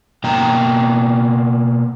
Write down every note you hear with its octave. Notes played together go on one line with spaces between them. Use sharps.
B2 A#3 G5 A#5